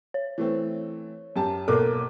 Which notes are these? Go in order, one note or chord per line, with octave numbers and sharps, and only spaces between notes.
C#5
E3 A3 C4
F#2 G4 A5
B1 A#3 A4 A#4 D6